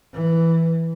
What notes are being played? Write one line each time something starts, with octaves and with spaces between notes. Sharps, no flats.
E3